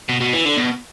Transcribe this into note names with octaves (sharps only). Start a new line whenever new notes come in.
B2
B2
E3
D3
B2